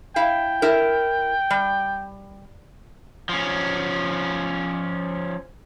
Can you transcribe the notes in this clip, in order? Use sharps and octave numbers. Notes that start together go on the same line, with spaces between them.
E4 F5 G5
E4 A#4
G3
F3 C#4